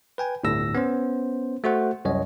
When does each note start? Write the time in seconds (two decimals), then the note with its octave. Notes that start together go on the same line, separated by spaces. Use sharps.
0.18 B4 G5 G#5
0.43 G1 D2 A2 E6 A#6
0.75 B3 C#4 C5
1.64 A3 F#4 C5 F#5
2.05 C2 F#2 C#5 D#5